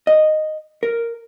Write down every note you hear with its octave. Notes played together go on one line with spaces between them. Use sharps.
D#5
A#4